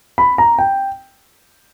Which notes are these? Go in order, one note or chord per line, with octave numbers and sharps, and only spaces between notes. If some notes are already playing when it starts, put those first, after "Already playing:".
B5
A#5
G5